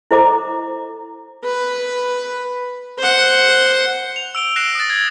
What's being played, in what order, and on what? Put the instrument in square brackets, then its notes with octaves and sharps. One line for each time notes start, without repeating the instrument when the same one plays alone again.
[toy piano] E4 A4 C5 D#5 A#5 D6
[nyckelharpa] B4
C5 F#5
[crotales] F7
E6 D7 G7
F#6 A#6 C7 D7 E7
D#6 A6
G#6